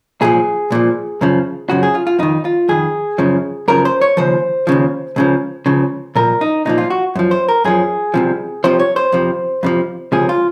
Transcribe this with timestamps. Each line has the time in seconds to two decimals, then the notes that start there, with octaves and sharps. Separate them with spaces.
0.21 C2 A#2 F3 G#4
0.70 C2 A#2 F3
1.21 F#2 C#3 F3
1.69 F#2 C#3 F3 F#4
1.83 G#4
1.95 F4
2.07 F4
2.19 F2 D#3 D#4
2.45 F4
2.69 F2 D#3 G#4
3.18 F#2 C#3 F3
3.68 F#2 C#3 F3 A#4
3.85 C5
4.01 C#5
4.17 D#2 C#3 F3 C5
4.67 D#2 C#3 F3
5.16 C#2 C#3 F3
5.66 C#2 C#3 F3
6.15 C2 A#2 F3 A#4
6.41 D#4
6.65 C2 A#2 F3 D#4
6.78 F4
6.90 F#4
7.15 F#2 F3
7.31 C5
7.49 A#4
7.64 F#2 F3 G#4
8.14 C2 C3 F3
8.64 C2 C3 F3 C5
8.80 C#5
8.96 C5
9.12 F2 C3 F3
9.63 F2 C3 F3
10.12 C#2 C3 F3 G#4
10.29 F4